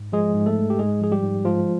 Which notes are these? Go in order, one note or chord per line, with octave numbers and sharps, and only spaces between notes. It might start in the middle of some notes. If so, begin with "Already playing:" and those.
Already playing: G#2
F3 G#3 G#4
G#2
A3 A4
G#3
G4
G#2 G#3 G#4
F3 G#4
G3 G4
G#2
F3 G#3 F4